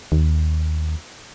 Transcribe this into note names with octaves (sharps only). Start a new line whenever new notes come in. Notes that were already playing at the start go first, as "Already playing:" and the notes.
D#2